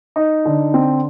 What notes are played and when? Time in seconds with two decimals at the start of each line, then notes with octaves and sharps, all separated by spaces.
0.16 D#4
0.45 D3
0.74 C4